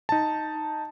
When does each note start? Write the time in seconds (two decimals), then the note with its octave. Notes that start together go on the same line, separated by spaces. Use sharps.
0.09 D#4 A5